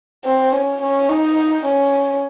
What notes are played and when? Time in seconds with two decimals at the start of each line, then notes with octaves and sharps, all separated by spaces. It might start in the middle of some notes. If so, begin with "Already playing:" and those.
0.25 C4
0.53 C#4
0.82 C#4
1.09 D#4
1.66 C#4